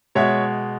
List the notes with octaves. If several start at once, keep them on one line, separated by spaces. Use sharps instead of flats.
B2 G#3 C#5 E5